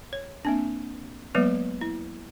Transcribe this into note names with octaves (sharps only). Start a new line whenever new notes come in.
C#5
A#3 C4 D4
F#3 G#3 A#3 B3 B4
E4